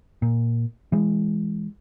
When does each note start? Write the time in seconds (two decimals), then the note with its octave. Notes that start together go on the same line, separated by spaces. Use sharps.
0.22 A#2
0.92 E3 G#3